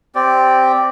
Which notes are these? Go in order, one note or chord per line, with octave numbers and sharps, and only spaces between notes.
C4 G4 D5